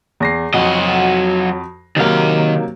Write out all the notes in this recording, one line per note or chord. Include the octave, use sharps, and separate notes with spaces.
E2 A#6 C7
F2 F#3 F#4 D#5
C3 D#3 F#3 A#3 F5